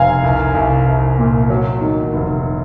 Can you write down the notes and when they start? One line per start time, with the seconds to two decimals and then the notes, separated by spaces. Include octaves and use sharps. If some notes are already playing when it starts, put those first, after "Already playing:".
Already playing: F1 F5 G#5 A#5
0.23 C2
0.55 C2
0.87 C2
1.18 A#2
1.50 F#3
1.81 D#3
2.13 F1